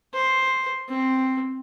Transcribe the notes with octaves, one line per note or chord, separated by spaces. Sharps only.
C5
C4